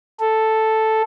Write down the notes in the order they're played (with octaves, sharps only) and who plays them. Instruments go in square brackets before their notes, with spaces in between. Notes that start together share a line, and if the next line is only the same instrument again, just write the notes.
[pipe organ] A4